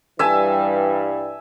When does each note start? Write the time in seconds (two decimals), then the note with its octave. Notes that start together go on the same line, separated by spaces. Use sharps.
0.19 G2 E3 G3 E5 G#5 A5